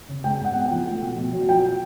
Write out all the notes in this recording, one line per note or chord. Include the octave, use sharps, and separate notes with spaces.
C#3
G#3 G5
G#2
F#5
B3
G5
F3
A3
B2
B2
F#3
F3 G5